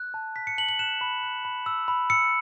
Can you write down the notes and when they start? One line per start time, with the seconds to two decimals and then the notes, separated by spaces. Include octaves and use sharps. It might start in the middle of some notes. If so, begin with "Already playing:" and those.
Already playing: F#6
0.14 A5
0.36 F#6 B6
0.47 C#7
0.58 A5 F#7
0.69 F#7
0.79 F#6 E7
1.01 B5
1.23 F#6
1.45 B5
1.66 E6
1.88 B5
2.10 E6 C#7